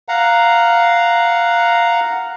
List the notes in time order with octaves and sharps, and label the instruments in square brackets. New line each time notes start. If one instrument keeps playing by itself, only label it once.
[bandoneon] F5 F#5 A#5